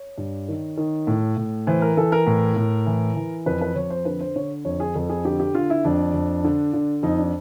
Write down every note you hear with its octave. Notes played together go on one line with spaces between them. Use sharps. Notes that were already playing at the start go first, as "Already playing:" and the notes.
Already playing: C#5
G2
D#3
D#3
A2
A2
E3 C5
A#4
E3 A4
A#4
A2
A2
E3
E3
F2 B4
B4
F2 C#5
C5
D3 B4
C5
D3 C#5
F2 C#5
G#4
F2 A4
G#4
D3 G4
G4
D3 F4
E4
F2 D4
F2
D3
D3
F2 D#4
D4